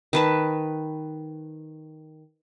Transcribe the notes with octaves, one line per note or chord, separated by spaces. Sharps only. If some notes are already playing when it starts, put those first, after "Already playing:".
D#3 B4 A5